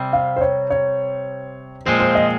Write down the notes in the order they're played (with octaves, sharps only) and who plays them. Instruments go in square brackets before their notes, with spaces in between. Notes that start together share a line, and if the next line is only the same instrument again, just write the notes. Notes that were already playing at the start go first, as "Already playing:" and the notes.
Already playing: [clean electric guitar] C3 G3 C4
[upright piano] F5
C5
C#5
C#5
[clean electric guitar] A#2 F3 G#3 C4 [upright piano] C5
[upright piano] C5
D#5